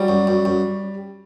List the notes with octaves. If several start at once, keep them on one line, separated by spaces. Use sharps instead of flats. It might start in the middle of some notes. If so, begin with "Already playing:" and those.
Already playing: F#3 G3
F#2
F#2
F#2